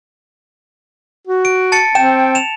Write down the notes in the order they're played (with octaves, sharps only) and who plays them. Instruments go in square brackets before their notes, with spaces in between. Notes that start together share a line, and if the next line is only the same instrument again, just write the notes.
[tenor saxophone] F#4
[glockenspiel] D7
A5 A6 C#7
[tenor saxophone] C4 [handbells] G5 [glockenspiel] E7
[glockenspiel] E7 F7